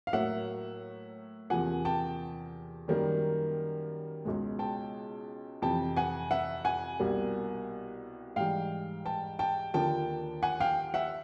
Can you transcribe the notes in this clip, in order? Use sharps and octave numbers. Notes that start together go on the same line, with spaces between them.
F5
A2 F#3 A#3 E5 F#5
E2 C3 F3 A#3 F#5 G#5
G5 A5
F#2 D#3 G3 A#3
C#2 B2 G#3
G5 A5
F2 C3 E3 G5 A5
F#5 G#5
E5 F#5
F#5 G#5
C2 B2 G3 A#3
G#2 E3 G3 F5 G5
G5 A5
G5 A5
D#2 D3 F3 A#3 G5 A5
F#5 G#5
F5 G5
E5 F#5